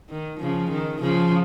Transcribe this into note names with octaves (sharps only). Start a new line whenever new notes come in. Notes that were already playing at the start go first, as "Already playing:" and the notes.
D#3
C#3 F3
D#3
C#3 F3